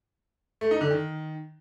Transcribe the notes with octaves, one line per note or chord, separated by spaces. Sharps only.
A3
D#4
D3
D#3